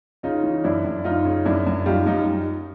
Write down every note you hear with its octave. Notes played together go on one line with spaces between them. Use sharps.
C#3 D#4 F4
E3
F#2 D4 E4
F#2
F#2 D#4 F4
C#3
F#2 D4 E4
F#2
G3 D#4 F4
F#2 D#4 F4